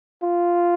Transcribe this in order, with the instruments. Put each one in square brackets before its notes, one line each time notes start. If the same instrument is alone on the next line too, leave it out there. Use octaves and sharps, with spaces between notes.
[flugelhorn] F4